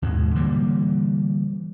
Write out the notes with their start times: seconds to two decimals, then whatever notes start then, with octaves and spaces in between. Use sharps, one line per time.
0.02 D#2 G#2 B2 G#3
0.34 D3 E3 G3 A#3